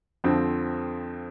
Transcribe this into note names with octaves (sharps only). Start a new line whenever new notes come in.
F2 D3 F3 C4